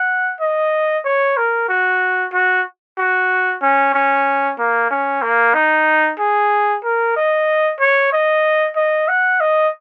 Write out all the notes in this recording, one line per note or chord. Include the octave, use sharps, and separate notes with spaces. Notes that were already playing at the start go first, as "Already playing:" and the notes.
Already playing: F#5
D#5
C#5
A#4
F#4
F#4
F#4
C#4
C#4
A#3
C#4
A#3
D#4
G#4
A#4
D#5
C#5
D#5
D#5
F#5
D#5